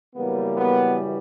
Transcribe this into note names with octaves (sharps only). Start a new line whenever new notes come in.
F#2 C#3 E3 G3 A#3 B3
B3